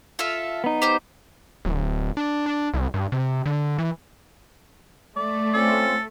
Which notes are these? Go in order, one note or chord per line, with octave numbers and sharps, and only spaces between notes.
F4 A4 E5
B3 D#4
G4 C5 G6
D1
D4
D4
C2
G2
C3
D3
E3
A3 D5
C4 C#4 F4 A4